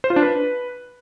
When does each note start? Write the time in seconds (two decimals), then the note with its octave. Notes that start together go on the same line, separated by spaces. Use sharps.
0.04 C5
0.10 F4
0.16 D4
0.22 B4